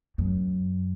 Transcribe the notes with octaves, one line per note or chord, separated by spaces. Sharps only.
F#2